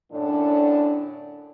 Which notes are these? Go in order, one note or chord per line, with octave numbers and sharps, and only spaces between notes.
F#2 A2 D3 D4